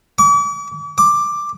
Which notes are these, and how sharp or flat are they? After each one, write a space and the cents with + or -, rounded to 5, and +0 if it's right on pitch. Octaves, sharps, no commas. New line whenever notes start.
D6 -40
D6 +10